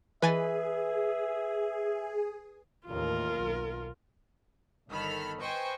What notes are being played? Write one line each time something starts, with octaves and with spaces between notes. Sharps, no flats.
E3 G#4 B4 E5 G#5 A6
A1 D#2 F4 A#4
B1
G1 D#3 A4 B5 F6
B4 C5 D#5 G5 G#5 C#6